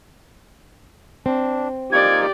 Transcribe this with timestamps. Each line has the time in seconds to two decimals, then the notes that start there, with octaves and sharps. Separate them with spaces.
1.26 C4 D4
1.92 A#3 D#4 F4 G4 D5 G#6